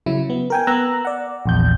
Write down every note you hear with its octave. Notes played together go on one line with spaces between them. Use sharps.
C#3 F#3 E4
B3
A#4 G5 G#5
B3 A#5 E6 F#6
D5 F#5
A#1 E2 G6